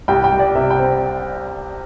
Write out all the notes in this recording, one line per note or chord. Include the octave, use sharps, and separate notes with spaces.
C2 G5
G5
G3
D5
C3 E5
G5
C4